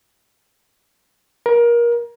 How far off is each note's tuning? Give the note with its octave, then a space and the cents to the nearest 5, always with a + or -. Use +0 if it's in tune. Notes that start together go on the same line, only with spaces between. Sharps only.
A#4 +25